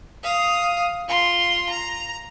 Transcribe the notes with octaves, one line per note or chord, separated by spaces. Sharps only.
F5 D#6
F4 C6
A#5